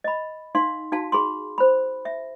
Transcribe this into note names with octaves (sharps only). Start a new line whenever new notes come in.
D#5 B5
D#4 F5 C6
D#4 F#4 F5 A5
G#4 B5 C6
C5 B5
E5